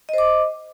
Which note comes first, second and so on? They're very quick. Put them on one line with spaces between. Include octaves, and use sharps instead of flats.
D#5 C5 D6